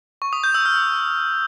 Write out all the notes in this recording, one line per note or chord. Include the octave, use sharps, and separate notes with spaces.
C#6
D#6
G6
E6
F6